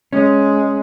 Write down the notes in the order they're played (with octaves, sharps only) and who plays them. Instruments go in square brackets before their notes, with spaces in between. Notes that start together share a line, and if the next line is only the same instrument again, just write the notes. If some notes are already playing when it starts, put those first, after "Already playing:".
[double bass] G#3 [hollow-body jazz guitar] C#4